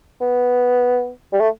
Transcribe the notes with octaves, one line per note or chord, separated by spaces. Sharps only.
B3
G3
A3